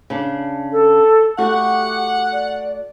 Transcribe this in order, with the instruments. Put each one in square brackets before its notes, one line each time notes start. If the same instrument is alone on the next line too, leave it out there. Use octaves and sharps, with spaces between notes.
[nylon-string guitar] C#3 D4
[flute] A4
[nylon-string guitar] A3 F#4 [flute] G4 [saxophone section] F#5
[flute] D5